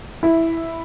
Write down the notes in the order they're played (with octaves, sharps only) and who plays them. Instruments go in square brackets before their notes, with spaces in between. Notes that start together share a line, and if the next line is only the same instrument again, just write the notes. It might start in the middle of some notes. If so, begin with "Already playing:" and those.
[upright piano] E4